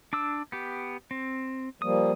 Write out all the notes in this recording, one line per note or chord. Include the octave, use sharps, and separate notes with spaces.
D4 D6 E6
B3 G4
C4
F3 G3 A#3 D#6